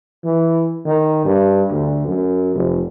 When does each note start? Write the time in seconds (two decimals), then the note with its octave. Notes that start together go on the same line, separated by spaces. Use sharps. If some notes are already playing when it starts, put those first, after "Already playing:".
0.24 E3
0.86 D#3
1.25 G2
1.71 D2
2.07 F#2
2.55 F1